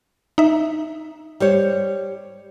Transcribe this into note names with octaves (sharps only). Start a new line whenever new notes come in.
D#4 E5
G3 C5 C#5